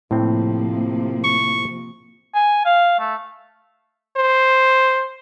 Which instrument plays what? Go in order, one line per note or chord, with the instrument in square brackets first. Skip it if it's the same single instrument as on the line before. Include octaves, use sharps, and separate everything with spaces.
[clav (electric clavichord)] A2 C4 [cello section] C3 F3 A#3
[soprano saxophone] C#6
[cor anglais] G#5
F5
A3
[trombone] C5